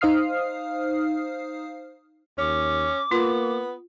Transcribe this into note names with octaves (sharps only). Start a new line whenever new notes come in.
D#4 C5 F5 D#6 F6 C7
D#2 C#4 D6
A#3 B3 F4